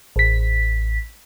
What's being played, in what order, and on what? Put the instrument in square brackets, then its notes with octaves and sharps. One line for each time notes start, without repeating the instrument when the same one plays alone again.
[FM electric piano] A1 B6